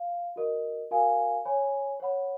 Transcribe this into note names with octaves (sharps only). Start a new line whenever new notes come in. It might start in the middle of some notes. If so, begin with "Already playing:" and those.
Already playing: F5
F#4 A#4 D#5
F#4 A#4 F5 G#5
C#5 G#5 B5
C#5 F#5 B5